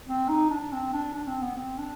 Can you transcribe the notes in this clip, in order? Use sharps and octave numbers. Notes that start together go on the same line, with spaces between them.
C4
D#4
D4
C4
D4
D4
C4
B3
C4
D4